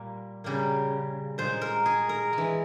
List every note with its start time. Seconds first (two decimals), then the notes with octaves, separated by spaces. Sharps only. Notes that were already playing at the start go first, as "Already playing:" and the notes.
Already playing: A#2 G3 A#3
0.44 C#3 G3 A#3
1.38 A#2 G#3 C5
1.61 A#4
1.86 G#4
2.09 A#4
2.33 G#3
2.38 E3